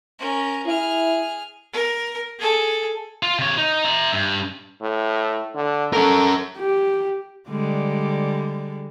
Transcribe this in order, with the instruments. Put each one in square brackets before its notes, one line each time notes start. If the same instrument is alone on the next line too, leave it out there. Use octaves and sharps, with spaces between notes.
[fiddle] C#4 A#4
[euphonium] E4 [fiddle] G#4 F6
[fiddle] A#4
G#4 A4
[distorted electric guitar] F4
C3 C#5
D#4
E5 A#5
G2
[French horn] A2
D3
[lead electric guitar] C#4 A#4 [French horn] A4
[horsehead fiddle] G4
[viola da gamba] D3 G3 G#3